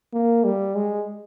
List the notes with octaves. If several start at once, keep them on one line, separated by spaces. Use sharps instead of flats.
A#3
G3
G#3